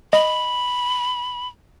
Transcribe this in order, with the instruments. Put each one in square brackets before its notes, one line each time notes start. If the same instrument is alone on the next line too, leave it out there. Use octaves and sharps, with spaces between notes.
[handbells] D#5 [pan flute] B5